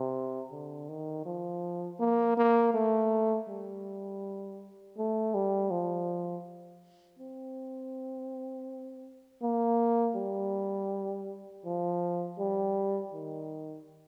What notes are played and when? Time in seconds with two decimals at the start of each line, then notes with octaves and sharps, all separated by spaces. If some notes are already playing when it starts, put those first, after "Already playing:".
Already playing: C3
0.52 D3
0.89 D#3
1.26 F3
2.00 A#3
2.38 A#3
2.74 A3
3.49 G3
4.98 A3
5.34 G3
5.71 F3
7.19 C4
9.42 A#3
10.16 G3
11.65 F3
12.39 G3
13.13 D#3